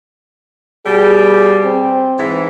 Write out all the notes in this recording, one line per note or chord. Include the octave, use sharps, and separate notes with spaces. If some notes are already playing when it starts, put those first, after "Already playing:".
B2 G3 G#4
C4
G#2 E3